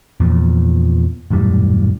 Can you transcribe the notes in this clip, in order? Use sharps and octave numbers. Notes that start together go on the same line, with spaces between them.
E2 A#2 F3
D#1 F#2 A2 G3